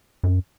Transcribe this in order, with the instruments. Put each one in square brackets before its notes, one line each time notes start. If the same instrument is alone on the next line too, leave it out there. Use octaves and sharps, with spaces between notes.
[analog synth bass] F#2